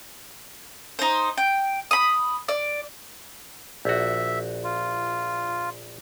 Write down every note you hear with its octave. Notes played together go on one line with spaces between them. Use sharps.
D#4 C5
G5
B5 D#6
D5
A#1 F#4 E5
F4